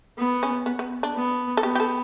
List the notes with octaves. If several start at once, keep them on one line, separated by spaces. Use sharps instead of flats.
B3
C#4
B3
B3
D4
B3
A4
B3 G4
G4
A4